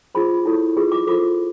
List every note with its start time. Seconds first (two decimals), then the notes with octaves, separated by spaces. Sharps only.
0.15 F4 G#4 C5 B5
0.45 E4 A4 C#5
0.77 F4 G#4 B4
0.92 D6
1.07 F4 A4 C5 D6